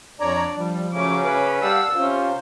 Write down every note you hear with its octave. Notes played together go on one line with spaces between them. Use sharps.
F2 D4 C#5 D5 A#5
F3 G3
C#3 F#3 A3 C#4 D6
B4
G3 F5 F#5 A5 E6
C3 C#4 F4 C5